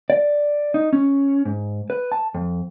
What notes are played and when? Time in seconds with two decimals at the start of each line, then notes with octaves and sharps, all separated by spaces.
0.10 D5
0.74 D#4
0.93 C#4
1.45 G#2
1.90 B4
2.12 A5
2.34 F2